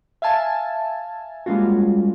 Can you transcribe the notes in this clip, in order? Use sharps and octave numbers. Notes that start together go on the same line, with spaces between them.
E5 F5 G#5 A5
G3 G#3 A#3 C#4 F4 F#4